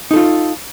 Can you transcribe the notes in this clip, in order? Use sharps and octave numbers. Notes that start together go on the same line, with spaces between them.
D#4 F4 A4